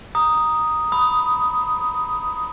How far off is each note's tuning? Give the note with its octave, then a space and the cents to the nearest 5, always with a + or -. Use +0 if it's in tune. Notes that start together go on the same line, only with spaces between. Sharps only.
A#5 +10 D#6 +0
B5 +5 D#6 +10